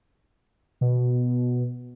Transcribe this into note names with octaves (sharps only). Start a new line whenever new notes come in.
B2